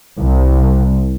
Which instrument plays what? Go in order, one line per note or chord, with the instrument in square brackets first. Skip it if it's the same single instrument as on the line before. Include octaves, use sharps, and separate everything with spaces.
[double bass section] C2